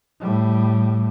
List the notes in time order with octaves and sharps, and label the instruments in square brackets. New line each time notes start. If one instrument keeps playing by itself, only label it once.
[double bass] A2 G3